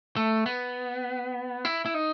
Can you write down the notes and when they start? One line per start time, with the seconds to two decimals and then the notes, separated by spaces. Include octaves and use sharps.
0.17 A3
0.46 B3
1.65 E4
1.86 E4
1.94 D#4